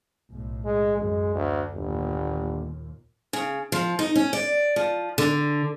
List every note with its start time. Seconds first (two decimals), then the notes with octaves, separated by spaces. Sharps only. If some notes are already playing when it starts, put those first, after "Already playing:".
0.30 B1 A2
0.65 G#3
0.97 F#2 G#3
1.35 D2
1.73 G1 D#2 A#2
3.33 C#3
3.72 F3
3.99 D#4
4.16 C#4
4.33 D5
4.76 F3
5.18 D3